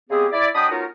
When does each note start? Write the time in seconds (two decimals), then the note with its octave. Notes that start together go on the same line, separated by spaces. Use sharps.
0.10 C#3 G#3 B3 C4 G4 G#4
0.32 E4 D5
0.54 F#3 D4 D#5 G5 B5 D#6
0.70 B3 C#4 D#4 F4 F#4 A#4